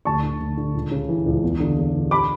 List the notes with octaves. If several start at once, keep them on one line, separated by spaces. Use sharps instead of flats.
D2 A5 C#6
D3
D2
D3
C#2
C#3
E3
C#2
E2
D3
E2
D3
B5 D6